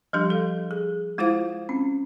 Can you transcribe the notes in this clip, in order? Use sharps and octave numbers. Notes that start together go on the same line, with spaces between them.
F3 G3 D4 G4
A4 F5
G#4
G#3 E4 F4 C5 F5
C4 C#4